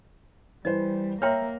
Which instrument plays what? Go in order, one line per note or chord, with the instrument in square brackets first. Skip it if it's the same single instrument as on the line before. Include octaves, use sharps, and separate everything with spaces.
[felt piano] E3 B4 C5 [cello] G3 [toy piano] D#5
[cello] A#3 [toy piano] C#5 G5 C6 [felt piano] E5 A#5 F6